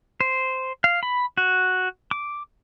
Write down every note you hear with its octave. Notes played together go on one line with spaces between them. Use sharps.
C5
F5
B5
F#4
D6